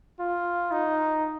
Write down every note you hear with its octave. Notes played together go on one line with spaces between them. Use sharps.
F4
D#4